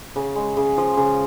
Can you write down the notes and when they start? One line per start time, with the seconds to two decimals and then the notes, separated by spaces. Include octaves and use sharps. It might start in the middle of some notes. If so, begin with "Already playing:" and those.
0.16 C#3
0.35 G#3
0.57 C#3
0.77 F3
0.97 C#3